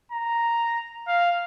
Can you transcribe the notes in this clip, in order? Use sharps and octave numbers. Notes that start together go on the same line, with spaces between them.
A#5
F5